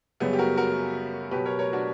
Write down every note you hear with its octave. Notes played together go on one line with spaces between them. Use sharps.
F#2 C#3 G3 B3
G4
F#4 A#4
F#4 A#4
B2 F#3 G4 B4
A#4 C#5
A#4 C#5
D4 F#4